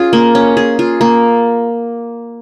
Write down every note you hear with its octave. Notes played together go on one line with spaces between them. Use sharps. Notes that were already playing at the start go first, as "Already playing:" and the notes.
Already playing: C#4 F4 G#4
A#3
C#4
G#4
F4
A#3